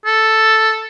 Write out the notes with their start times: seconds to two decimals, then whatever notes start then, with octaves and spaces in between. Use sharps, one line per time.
0.06 A4